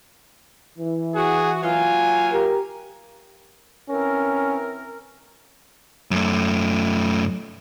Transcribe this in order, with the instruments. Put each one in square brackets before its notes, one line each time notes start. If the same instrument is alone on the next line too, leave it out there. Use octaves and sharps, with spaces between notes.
[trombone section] E3
[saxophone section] F#4 [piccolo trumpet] G#4
[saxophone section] F#3 A#3 F4 [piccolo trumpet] G#5
[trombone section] G4 A#4
[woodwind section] E3 C4 A#4 [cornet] C#4
[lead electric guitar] F#2 A3